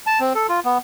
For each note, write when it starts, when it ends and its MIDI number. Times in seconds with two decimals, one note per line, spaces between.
0.07 0.20 81
0.20 0.33 60
0.35 0.47 69
0.49 0.60 65
0.65 0.78 59